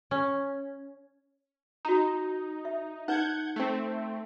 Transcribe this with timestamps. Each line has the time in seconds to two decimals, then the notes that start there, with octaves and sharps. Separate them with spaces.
0.11 C#4
1.85 D#4 F#4 A#5
2.65 E5
3.08 D#4 B4 F#5 G6 G#6
3.56 A3 C4